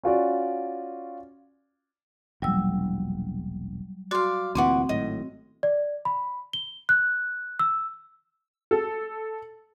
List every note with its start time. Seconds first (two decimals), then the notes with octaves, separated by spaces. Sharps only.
0.03 C#4 F4 F#4 D5
2.42 E1 A#1 F#3 G3 E6
4.11 F#4 D5 F5 C6
4.55 D2 A#2 E3 C4 F#5 C#6 D6
4.89 G#1 A2 F#3 D#5
5.63 D5
6.05 B5
6.53 G7
6.89 F#6
7.59 E6
8.71 A4